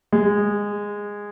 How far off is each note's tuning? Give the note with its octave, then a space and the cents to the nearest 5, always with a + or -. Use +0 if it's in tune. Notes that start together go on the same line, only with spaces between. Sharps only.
G#3 -15